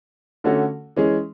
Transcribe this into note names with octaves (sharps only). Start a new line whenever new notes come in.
D3 A3 C#4 F#4 A4
E3 G#3 C#4 G#4